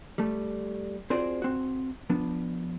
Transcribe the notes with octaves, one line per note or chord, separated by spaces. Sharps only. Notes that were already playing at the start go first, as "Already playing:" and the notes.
G3 A3
C4 F4 F#4 G#4 C5 D5
C4 F#4
F3 B3 D4